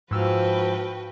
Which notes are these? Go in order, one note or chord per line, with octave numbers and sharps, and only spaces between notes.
G#2 F3 F#4 B4 G5 E6 F6